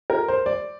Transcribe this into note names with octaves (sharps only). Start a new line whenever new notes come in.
A#4
C5
D5